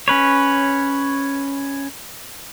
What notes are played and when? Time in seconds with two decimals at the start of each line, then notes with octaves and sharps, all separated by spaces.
0.08 C#4 B4 C#5